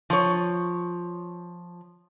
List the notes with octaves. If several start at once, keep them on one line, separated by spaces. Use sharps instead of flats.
F3 C#5